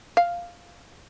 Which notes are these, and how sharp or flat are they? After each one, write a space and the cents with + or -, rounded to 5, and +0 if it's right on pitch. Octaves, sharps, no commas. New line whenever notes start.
F5 +0